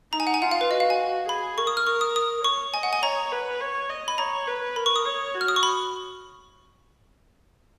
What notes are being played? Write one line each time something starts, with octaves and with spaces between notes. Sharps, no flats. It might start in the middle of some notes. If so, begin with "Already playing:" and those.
D#4 A#5
G#5
F#5
G#5
F4 F#5
F5
B4
F#4 D#5
F5
G#5
G#4 B5
A#4 C#6
D#6
F6
A#4 C#6
D#6
D#6
C#5 C#6
D#5 G#5
F#5
G#5
C#5 A#5
B4
C#5
D#5
B5
C#5 A#5
B4
A#4 B5
C#6
D#6
C#5
F#4
F6
D#6
C#6
B5